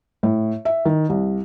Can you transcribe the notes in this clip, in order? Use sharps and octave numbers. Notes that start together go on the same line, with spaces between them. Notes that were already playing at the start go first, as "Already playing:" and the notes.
A2
E5
D#3
C2